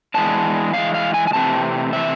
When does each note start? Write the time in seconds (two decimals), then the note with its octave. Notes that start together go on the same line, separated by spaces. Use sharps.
0.14 E3 G#3 B3 D4 A5
0.74 E3 G#3 B3 D4 F5
0.94 F5
1.14 G#5
1.27 G#5
1.33 C3 E3 A3 C4 A5
1.93 C3 E3 A3 C4 E5